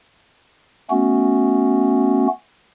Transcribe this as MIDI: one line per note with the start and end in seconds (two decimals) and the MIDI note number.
0.90 2.27 57
0.90 2.27 59
0.90 2.27 61
0.90 2.27 66